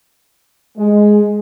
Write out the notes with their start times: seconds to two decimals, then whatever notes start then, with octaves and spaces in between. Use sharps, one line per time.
0.78 G#3